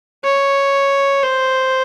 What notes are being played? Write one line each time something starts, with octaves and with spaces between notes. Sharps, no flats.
C#5
C5